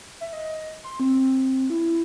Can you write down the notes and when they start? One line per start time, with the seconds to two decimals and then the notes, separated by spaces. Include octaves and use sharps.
0.21 E5
0.33 D#5
0.84 C6
1.00 C4
1.70 E4